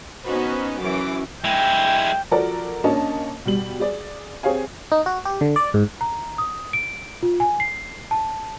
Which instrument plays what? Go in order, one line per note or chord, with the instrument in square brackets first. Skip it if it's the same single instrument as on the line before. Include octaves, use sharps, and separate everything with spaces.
[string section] B3 C#4 D#4 F#4 B4 C5
F#2 E3 C#4 D6
[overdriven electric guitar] G#3 E4 [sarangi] G5
[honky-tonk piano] F3 F#4 A4 A#4 D5
A#3 C#4 D4 D#5 A5
B2 G3 F#7
G#4 D5
C4 G4 G#4 C#5 F5 G#5
[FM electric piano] D#4
F#4
G4
D3
D5
G#2
[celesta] A#5
D#6
D7
F4
G#5
C7
A5